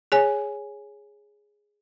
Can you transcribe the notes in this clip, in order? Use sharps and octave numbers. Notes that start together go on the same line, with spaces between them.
G#4 C#5 G#5